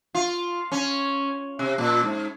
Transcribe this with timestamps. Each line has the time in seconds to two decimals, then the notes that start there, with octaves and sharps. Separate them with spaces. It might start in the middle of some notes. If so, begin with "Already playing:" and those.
0.15 F4
0.72 C#4
1.59 C3
1.78 A#2
2.04 G#2